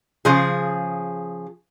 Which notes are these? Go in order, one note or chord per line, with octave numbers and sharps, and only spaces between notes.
C#3 F3 G#4